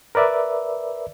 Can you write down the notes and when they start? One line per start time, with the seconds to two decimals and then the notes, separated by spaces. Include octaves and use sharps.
0.15 A#4 B4 D5 E5